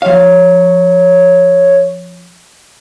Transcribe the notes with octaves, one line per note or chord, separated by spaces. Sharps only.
F3 C#5 F5